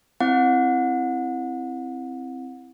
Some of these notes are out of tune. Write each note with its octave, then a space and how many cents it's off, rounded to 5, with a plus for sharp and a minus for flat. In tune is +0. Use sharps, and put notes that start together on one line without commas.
C4 +0 E4 +0 F#5 -30